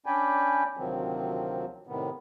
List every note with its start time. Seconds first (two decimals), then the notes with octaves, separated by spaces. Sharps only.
0.06 C#4 D4 D5 G5 G#5 B5
0.77 D2 C3 D#3 F3 F#3 C4
1.87 A2 C3 D#3 B3